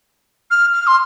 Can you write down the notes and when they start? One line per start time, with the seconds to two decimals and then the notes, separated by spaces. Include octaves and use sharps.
0.51 F6
0.73 F6
0.87 C6